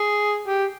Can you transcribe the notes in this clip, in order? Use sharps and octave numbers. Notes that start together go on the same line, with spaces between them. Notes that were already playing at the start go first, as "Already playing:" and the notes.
Already playing: G#4
G4